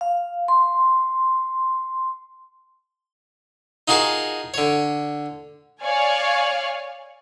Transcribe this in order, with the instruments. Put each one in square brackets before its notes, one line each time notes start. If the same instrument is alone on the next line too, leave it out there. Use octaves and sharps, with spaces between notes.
[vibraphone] F5
C6
[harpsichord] D#4 F4 F#4 G#4 A#4 A5
D3 C#5
[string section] C#5 D5 F5 G#5